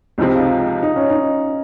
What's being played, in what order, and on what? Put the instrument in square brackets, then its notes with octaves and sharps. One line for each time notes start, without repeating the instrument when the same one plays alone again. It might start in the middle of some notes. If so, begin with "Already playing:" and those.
[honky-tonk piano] C#2 C3 F3 C4 [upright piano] D#4
[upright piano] F4
D#4
D#4
C#4
D#4